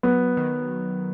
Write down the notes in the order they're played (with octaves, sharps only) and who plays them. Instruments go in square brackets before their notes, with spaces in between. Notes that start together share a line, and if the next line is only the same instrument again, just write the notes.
[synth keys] F#3 [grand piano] B3
[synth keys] D#3